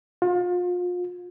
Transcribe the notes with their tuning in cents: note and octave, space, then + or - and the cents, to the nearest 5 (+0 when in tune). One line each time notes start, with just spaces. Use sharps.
F4 +35